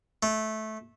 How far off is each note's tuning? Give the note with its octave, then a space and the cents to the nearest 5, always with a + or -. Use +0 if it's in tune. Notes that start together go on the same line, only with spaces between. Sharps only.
A3 -15